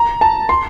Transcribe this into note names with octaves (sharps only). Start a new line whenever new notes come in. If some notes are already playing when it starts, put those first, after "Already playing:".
Already playing: A#5
A5
C6